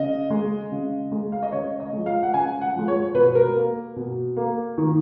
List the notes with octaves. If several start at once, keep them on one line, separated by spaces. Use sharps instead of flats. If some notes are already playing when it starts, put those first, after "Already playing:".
Already playing: C#3 D#5
G#3
C#3
G#3
F5
D#5
C#3 C#5
D#5
F3 G#3
F5
F#5
C#3 G#5
F#5
F3 G#3
C#5
B2 B4
A#4
A#3
B2
A#3
D#3